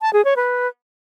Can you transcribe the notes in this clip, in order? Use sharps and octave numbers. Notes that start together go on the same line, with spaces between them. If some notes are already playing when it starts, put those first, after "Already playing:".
A5
G#4
C#5
B4